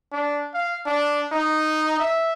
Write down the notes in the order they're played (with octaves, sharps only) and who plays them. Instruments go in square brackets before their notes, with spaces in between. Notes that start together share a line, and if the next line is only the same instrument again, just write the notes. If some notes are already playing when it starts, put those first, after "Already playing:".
[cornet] D4
F5
D4
D#4
E5